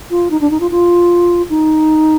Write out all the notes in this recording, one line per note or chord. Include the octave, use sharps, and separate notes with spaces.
F4
D#4
D4
D#4
F4
F4
D#4